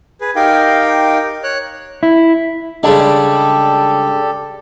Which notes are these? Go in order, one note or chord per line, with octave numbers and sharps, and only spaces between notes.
G#4 B4
D#4 G4 A#4 F5 G5
C#5 F#6
E4
C#3 G3 G#3 D4 G4 A4